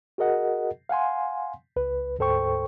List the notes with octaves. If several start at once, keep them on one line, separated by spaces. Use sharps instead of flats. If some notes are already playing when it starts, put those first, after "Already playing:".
F#4 G#4 A#4 D#5 F#5
F5 F#5 G#5 C6
C#2 B4
D2 G#2 A4 C5 G5 C#6